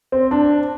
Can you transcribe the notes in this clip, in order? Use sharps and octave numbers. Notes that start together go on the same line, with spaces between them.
C4
D4